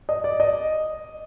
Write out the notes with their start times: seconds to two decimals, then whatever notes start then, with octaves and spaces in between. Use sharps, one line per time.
0.09 D#5
0.24 D5
0.40 D#5